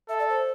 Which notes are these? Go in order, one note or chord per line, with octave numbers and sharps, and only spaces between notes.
A4 E5
D5
C5